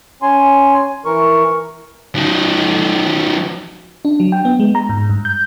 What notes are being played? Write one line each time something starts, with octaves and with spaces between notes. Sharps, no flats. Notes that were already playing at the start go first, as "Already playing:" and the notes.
C#4 G#5 C6
E3 A#4 C#6
D#3 F#3
D4
F#3
G5
B3
G#3
A#5
G#2
G2
G6